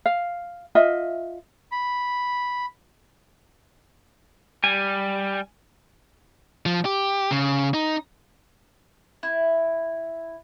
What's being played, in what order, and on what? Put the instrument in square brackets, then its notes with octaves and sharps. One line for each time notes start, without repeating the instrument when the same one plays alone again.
[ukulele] F5
F4 D#5 E5
[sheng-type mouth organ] B5
[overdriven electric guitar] G3 [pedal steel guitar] G#5
[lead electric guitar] F3
G4
C#3
D#4
[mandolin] E4